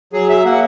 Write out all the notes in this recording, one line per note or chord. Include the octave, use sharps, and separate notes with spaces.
F#3 G#4
E5
A#3 F#5